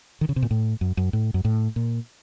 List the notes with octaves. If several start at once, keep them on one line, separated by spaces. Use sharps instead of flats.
D#3
C#3
C3
A#2
A2
F#2
F#2
A2
F#2
A2
A#2